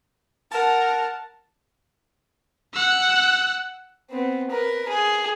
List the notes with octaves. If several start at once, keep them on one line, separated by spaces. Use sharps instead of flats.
A#4 F#5 A5
F#5 E6
B3 C4
A#4 B4
G#4